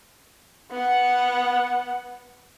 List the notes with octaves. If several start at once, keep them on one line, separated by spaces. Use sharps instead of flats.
B3 F#5